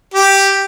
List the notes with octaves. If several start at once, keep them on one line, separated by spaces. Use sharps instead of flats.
G4